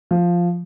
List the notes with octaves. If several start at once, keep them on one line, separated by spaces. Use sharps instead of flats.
F3